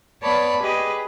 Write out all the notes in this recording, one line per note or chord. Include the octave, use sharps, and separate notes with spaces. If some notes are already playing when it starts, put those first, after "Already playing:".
B3 C#5 D5 A5 B5
G4 G#4 B4 D#5